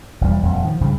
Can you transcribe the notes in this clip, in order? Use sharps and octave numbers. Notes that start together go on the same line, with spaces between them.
E1 F2 G3
D#1 F2
D#3 F3
C#2 G2 C#3